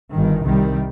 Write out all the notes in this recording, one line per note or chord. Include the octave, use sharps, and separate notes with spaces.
G1 G2 D#3
C2 C3 D#3 G3